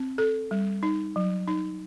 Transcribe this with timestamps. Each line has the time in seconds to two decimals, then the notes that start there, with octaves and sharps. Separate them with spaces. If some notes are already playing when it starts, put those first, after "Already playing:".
Already playing: C4
0.18 A4
0.51 G3
0.83 D#4
1.16 F#3
1.48 D#4